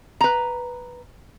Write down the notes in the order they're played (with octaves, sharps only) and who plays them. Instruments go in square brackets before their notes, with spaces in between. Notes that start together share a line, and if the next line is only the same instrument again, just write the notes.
[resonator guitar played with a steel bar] B4 A#5